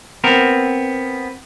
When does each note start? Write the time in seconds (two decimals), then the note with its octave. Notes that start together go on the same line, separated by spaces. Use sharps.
0.24 B3 C4 A#4